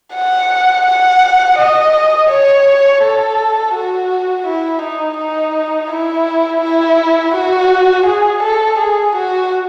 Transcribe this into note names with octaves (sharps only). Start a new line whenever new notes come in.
F#5
F#5
D#5
C#5
A4
F#4
E4
D#4
D#4
E4
E4
F#4
G#4
A4
G#4
F#4